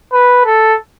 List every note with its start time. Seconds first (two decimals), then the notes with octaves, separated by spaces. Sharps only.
0.12 B4
0.45 A4